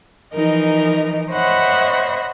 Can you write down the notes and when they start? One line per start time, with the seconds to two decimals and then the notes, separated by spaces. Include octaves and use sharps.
0.32 E3 F3 D#4 A#4 D#5
1.31 C5 C#5 D#5 E5 F#5 B5